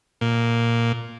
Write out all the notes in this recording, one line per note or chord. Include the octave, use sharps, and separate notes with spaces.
A#2